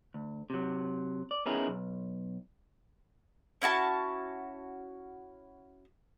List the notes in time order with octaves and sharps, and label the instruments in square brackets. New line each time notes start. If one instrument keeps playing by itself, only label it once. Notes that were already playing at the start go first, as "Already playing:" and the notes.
[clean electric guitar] D2
C3 F#3
D5
B3 C#4 D#4 E4 G#4 A#4
B1
[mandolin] C#4 E4 F#4 A5